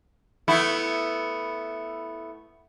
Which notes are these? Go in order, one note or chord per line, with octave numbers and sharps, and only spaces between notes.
A3 B3 E4